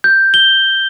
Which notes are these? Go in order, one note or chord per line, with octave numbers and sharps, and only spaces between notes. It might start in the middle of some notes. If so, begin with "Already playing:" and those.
G6
G7